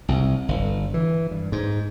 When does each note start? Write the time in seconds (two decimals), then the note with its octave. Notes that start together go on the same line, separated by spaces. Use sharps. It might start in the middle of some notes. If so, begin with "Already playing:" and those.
0.08 C2
0.48 G1
0.94 E3
1.31 G2
1.52 G#2